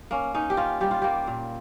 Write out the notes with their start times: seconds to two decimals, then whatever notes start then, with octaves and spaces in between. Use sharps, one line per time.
0.11 A#3 C#4
0.34 C#4 D#4
0.50 G4
0.57 C#4 F4
0.81 G3 G4
0.91 F4
1.02 A#3 G4
1.27 A#2